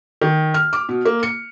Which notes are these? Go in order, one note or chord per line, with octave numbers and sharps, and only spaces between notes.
D#3
F6
D6
B2
A#3
C#7